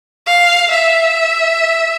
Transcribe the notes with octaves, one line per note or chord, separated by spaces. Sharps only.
F5
E5